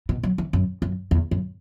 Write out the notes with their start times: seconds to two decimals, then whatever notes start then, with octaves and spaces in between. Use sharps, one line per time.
0.09 B2
0.23 F#3
0.38 E3
0.53 F#2
0.82 F#2
1.11 E2
1.31 F#2